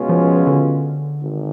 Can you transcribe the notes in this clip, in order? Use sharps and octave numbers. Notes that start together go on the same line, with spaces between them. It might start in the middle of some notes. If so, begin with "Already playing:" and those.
Already playing: C#2 B2 G#3 C#4 F4
F3
D3
G#1